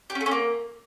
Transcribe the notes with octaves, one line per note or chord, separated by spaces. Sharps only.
G4
C#4
A3
C#4
A#3